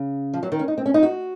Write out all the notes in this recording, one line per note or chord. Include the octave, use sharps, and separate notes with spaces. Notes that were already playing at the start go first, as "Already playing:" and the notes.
Already playing: C#3
F3
F#3
D#3
C#4
D#4
C4
C#4
D#4
F#4